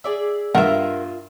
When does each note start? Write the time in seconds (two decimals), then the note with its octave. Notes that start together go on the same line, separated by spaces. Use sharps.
0.04 G#4 D5 E5
0.55 G2 F4 A#4 E5 F#5